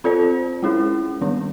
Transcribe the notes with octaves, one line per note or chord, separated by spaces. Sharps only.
C4 F4 A4 C5
G#3 C#4 E4 G#4
D#3 G3 B3 D4